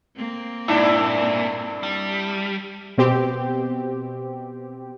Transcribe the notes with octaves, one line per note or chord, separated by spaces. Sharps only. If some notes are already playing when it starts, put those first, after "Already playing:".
A#3 C4
G2 A#2 D4 E4
G3
B2 C4 G4